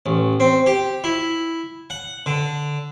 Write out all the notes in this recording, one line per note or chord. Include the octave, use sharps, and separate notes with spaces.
A1
C4
G4
E4
F#5
D3